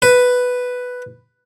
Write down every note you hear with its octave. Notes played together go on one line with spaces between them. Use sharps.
B4